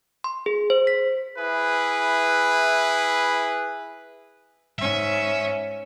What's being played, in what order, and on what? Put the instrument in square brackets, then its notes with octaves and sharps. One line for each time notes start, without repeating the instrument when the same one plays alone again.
[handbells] C6
G#4
C5
B6
[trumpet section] E4 G#4 B4
[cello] G#2 C#4 [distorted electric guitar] E5